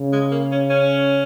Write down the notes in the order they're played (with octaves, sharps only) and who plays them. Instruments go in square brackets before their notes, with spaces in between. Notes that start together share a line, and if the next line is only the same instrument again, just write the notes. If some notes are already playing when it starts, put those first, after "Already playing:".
Already playing: [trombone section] C#3
[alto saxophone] G#3
A#3
C#4
C#4